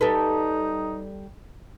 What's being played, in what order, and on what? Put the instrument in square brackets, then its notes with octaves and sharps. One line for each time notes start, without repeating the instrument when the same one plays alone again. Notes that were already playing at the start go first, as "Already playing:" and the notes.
[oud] G3 A4 B4 [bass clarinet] D#4